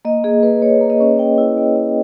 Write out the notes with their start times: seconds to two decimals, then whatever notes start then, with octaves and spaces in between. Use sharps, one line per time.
0.05 A#3 D#5
0.24 A#3 G#4
0.43 A#3 B4
0.62 A#3 C#5
0.81 A#3
0.90 D#5
1.00 C#4
1.19 A#3 G5
1.38 E4
1.57 A#3
1.76 E4